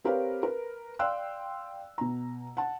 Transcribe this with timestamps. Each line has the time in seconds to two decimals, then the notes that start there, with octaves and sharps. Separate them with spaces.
0.04 C4 G4 A#4 B4 C#5 F5
0.43 A#4 B4
0.99 D5 F5 G5 C6 E6 F#6
1.98 B2 A#5
2.57 F#5 A5